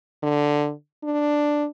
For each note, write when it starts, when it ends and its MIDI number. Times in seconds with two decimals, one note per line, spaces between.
0.23 0.72 50
1.04 1.67 62